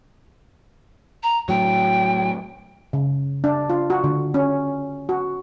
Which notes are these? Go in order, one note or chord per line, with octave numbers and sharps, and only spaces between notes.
A#5
A2 F#3 G5
C#3
D4
F4
F#4
D3
C#4
F#4